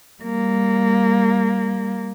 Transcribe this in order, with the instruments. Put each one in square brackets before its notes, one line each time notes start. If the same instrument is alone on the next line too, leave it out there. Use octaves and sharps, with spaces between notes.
[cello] G3 A#3